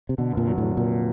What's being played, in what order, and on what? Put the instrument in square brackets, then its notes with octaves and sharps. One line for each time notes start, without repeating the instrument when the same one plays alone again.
[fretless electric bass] C3
[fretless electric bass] B2 [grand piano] D3
[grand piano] F1 [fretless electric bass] A#2
[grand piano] F#3
[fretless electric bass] A2 [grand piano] F#3
[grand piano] F1 [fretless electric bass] A#2